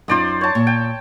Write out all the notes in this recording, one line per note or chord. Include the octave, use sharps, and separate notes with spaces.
F#2 D#4 F4 C5 D5 D#6
C#5 A5
A#2
G5